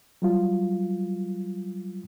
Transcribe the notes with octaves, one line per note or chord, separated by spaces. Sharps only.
F#3 G3 F4